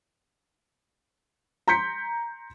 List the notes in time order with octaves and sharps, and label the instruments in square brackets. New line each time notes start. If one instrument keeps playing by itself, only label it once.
[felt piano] A#5 C6 G6 B6 C#7